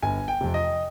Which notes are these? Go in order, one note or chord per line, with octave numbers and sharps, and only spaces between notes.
G1 G#5
G5
F2 C3
D#5